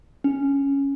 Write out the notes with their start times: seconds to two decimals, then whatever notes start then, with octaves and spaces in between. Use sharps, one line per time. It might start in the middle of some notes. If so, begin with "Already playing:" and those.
0.24 C#4